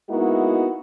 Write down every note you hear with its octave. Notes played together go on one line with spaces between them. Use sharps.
G#3 A#3 B3 D#4 E4 F#4